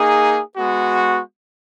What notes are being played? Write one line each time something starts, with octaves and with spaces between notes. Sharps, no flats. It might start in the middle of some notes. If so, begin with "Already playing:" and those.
Already playing: A#3 D#4 G#4
G#3 B3 F#4